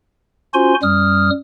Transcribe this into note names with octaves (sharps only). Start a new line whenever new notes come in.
C#4 F4 F#4 C5 G#5 C6
F#2 G3 D#6 F6